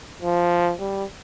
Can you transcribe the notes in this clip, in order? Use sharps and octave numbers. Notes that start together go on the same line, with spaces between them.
F3
G3